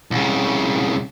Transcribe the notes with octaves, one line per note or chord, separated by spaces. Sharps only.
C2 C#3